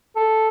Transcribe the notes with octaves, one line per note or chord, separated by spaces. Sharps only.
A4